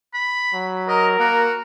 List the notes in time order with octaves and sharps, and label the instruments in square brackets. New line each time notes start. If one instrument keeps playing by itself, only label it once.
[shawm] B5
[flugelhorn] F#3
[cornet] A#4 [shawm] D#5
[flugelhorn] A#3 [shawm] F#4